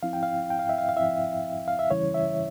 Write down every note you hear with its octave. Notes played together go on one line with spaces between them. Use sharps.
F3 C4 E4 F5
G5
F5
G5
F5
E5
F5
F5
F3 C4 E4 E5
F5
E5
C#3 E3 G3 C#4 E4 C#5
E5